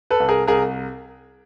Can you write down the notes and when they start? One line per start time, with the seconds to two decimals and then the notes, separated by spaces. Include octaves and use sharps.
0.10 A4 B4
0.20 C2
0.29 G#4 A#4
0.48 C2 G#4 A#4